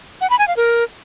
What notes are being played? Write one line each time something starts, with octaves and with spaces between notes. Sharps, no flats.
F#5
B5
G#5
F5
A#4